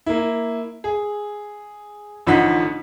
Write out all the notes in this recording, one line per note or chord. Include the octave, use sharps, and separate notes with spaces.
A#3 E4
G#4
A1 D3 F3 D#4 F#5 B6